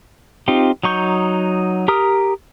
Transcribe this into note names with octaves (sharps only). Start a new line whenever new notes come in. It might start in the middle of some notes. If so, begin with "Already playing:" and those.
C4 D#4 F4 G4
F#3 D#4 C#6 G6
G4 A#4 A#5 D#6 F6